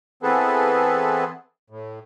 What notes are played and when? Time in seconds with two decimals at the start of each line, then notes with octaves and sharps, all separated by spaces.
0.23 E3 B3 C4 G#4 A4 B4
1.70 A2